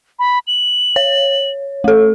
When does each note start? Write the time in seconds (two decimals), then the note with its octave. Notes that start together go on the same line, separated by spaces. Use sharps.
0.19 B5
0.47 F#7
0.96 C#5
1.84 A3 A4